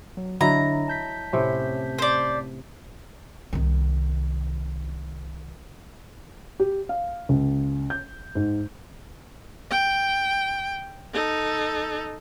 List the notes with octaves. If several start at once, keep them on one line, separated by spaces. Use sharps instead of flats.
F#3
D3 F#3 D4 E4 D#5 A#5
A5 G6 B6
A2 C3 C#4
C5 D5
C2 D#3
G4
F5
C#2
G6
G#2
G5
D#4 A4